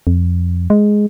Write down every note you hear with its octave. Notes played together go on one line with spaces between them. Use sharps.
F2
G#3